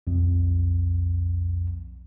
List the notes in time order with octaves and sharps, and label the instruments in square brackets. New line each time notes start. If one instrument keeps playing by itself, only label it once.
[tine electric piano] B1 F2